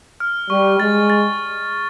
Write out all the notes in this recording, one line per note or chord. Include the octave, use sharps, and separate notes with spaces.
F6
G3 C#6
G#3 A6
A6